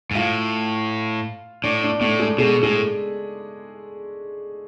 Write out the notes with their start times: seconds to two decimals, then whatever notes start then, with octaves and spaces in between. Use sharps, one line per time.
0.11 G#2
0.15 A2 F4 F5
1.63 A2 D4 D5
1.83 D4 D5
2.00 A2 A3 A4
2.20 G#3 G#4
2.38 B2 G#3 G#4
2.63 A2 G#3 G#4